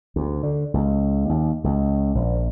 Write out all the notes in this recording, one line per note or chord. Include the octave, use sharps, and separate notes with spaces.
D2
D3
C#2
D#2
C#2
A#1